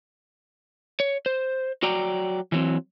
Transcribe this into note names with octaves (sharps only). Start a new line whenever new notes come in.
C#5
C5
F#3 F#4 D5 G5 A#5
E3 F#3 C4